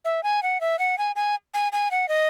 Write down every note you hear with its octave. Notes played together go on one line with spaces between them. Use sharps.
E5
G#5
F#5
E5
F#5
G#5
G#5
G#5
G#5
F#5
D#5